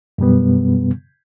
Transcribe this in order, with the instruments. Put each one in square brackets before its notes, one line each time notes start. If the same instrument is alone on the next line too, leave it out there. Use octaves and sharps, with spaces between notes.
[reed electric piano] F#2 B2 G3 B3